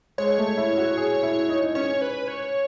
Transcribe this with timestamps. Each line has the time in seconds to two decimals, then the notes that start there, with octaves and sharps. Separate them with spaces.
0.18 G#3 C#5
0.39 A3
0.58 E4
0.77 F#4
0.97 G#4
1.23 E4
1.49 D#4
1.75 C#4 C#5
2.01 B4
2.28 C#5